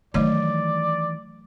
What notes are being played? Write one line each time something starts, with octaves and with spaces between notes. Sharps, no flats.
D#3 E3 F#3 A3 C#5 D5